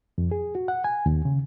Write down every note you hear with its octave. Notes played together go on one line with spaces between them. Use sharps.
F2
G#4
F#4
F#5
G#5
D#2
C#3